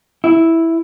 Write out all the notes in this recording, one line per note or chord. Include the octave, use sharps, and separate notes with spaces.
E4